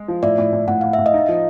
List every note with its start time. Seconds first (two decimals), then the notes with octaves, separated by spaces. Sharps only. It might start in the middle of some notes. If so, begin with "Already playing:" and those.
Already playing: G#3
0.08 F3
0.23 A2 D5 E5
0.38 A2
0.53 A2
0.68 A2 F#5
0.81 A2 F5
0.93 E5
0.98 A2
1.06 D#5 F5
1.14 D#4
1.29 F3